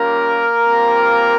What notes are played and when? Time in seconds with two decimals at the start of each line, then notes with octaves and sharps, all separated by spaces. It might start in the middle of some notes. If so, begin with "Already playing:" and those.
Already playing: G3 A#3 C#4 F4 A#4
0.67 G3 C4 F4